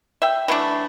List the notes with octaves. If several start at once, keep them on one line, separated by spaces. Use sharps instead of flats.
E5 G5
E3 F#3 A3 D4